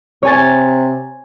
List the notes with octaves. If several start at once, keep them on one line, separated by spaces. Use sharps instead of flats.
C3 C#5 G#5 A6